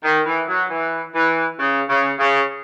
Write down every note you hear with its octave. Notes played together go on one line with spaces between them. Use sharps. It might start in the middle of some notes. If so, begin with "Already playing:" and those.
D#3
E3
F#3
E3
E3
C#3
C#3
C#3